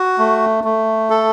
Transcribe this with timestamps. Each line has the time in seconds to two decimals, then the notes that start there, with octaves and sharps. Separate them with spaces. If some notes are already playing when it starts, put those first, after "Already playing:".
Already playing: F#4
0.18 A3
0.64 A3
1.10 A4